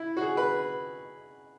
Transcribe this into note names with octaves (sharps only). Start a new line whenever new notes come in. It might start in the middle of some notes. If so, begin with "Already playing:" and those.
Already playing: E4
F#4
G#4
B4